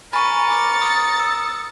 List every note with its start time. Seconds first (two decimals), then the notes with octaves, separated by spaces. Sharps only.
0.13 A#4 G#5 B5 C#6 A6 C#7
0.49 D6
0.81 D#6
1.20 E6